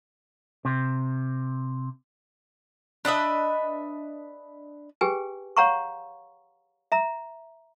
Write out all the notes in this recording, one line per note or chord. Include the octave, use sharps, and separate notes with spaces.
C3
D4 B4 D#5 E5
G4 G#4 B4 G5 G#5
C#5 F5 F#5 A#5 C6 C#6
E5 A#5